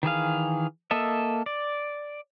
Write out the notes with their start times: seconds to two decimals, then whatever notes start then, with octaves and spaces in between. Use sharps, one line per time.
0.03 D#3 E3 G#4 F5
0.91 A#3 A4 D#5 E5
1.46 D5